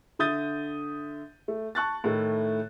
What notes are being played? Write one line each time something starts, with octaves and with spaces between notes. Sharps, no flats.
D3 E5 D#6 G6 A6 D#7
A3
A5 C#6 F#6 A6
A2 D#3 A3 E4